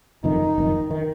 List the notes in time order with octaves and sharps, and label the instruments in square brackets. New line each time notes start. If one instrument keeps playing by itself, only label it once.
[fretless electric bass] F#1 F2 D#3 [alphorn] D#4
[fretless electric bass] F#1 F2 D#3
D#3